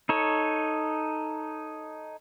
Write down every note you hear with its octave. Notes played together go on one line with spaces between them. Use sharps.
D#4 A4 C#5